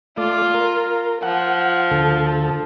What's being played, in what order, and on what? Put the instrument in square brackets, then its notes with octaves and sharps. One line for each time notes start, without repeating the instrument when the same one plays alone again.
[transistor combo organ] A3 D5 [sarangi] F4
[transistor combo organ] A#4
[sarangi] F3 [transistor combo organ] F#5
[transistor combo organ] D2 A4